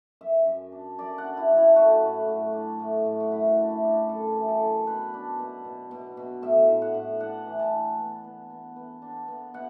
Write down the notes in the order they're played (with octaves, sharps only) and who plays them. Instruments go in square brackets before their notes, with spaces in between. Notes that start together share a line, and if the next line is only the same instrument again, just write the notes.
[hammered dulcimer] F#2 E5
F#2
D4
F#2 D5
F#5
D4
E4
F#3
E4
A3 F#4
A2
A2
D4
A2
A2
F#4
F#2 E4
D4
E4
D4
F#2 A4
E3
A4
F#2
B2 B4
D4
B2
B2
B2
B2
A2 E5
A2
F#5
A2
D4 F#5
E3
A5
D4
B3
B3
B3
B3
D4
B3
B2 F#5